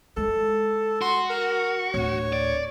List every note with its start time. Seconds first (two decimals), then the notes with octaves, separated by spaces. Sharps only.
0.17 G#3 A4
1.01 F#4 C6
1.30 A#4
1.94 D1 C#5
2.33 D5